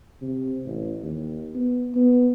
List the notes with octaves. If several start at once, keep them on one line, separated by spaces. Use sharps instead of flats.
C3
A1
D#2
B3
B3